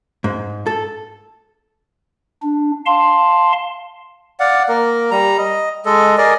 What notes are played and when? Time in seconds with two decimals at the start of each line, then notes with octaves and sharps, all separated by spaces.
0.24 G#2
0.67 A4
2.43 D4
2.86 F5 A5 C6
4.40 D5 F5 F#5
4.69 A#3 A#4
5.11 G3 A#5
5.38 D#5
5.85 G#3 A4 D#5
6.18 G#4 A#4 D5 D#5